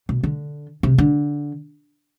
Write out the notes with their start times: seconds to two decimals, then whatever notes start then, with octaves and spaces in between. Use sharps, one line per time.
0.09 B2
0.23 D3
0.83 C3
0.98 D3